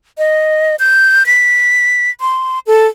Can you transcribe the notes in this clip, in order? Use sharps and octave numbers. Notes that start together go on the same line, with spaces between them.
D#5
G6
B6
C6
A4